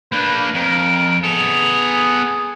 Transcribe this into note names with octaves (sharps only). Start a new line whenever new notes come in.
A#3 D4 B4 G6
F2 A#4 D7
B3 G#4 A4 F7